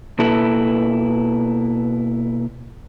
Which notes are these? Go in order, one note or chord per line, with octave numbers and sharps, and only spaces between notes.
B2 A#3 E4 A4 B4